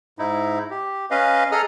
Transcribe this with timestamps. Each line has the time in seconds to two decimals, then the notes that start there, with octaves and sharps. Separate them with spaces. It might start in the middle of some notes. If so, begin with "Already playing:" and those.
0.19 G#2 D#4 E4
0.71 G4
1.11 C#4 B4 D#5 F5
1.52 G#4 A4 D#5 A#5 D#6 F6